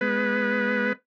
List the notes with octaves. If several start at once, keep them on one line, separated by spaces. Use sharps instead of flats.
G#3 B3 B4